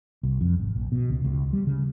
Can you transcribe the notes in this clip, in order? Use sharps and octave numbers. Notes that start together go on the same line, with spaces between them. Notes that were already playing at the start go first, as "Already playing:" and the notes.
C2
F2
G#1
A#1
B2
C#2
C#2
G3
C#3